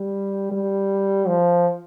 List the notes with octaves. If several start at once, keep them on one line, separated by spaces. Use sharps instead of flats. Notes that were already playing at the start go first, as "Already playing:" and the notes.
Already playing: G3
G3
F3